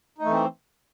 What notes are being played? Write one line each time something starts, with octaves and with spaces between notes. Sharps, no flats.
E3 A3 C4 D#4